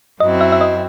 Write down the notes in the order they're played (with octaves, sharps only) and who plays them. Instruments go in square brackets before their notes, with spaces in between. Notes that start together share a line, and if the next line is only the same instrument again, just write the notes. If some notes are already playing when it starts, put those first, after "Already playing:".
[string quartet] F#2 F#3 C4 E4 [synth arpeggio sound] D#5
[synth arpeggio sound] E5
E5
D#5